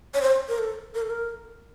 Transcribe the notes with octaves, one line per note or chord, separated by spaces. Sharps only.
C#5
C5
A#4
A4
A#4
A4
A#4